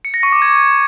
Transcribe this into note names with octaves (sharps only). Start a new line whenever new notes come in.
C#7
A#6
C#6
D6
G#6